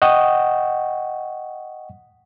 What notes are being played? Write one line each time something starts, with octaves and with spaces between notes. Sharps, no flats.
D#5 F#5 G5 C#6 D#6